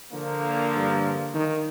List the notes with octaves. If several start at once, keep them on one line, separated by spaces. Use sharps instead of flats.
D3 F3 A#3
G2
D#3